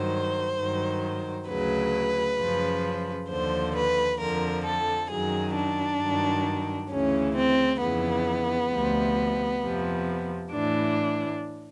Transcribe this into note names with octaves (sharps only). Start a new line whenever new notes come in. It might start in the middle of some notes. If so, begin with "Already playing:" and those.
Already playing: G2 D#3 F#3 C5
G2 D#3 F#3
D2 C#3 F#3 B4
F#2 C#3 F3
D#2 D3 F3 C5
B4
F2 D3 F3 A#4
A4
F#2 D#3 F#3 G#4
D4
G2 D#3 F#3
D2 C#3 E3 C#4
C4
F2 C#3 E3 B3
D2 C3 F3
F2 C3 F3
A2 E3 D4